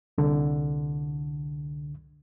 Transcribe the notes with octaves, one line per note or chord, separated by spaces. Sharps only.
C2 D3